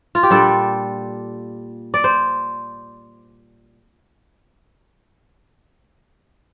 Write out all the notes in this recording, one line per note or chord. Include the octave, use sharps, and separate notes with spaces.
F4
G4
A#2 G3 D4 A4
D5
C5